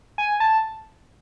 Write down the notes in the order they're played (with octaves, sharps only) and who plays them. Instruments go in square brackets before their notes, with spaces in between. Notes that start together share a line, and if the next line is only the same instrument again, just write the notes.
[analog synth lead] G#5
A5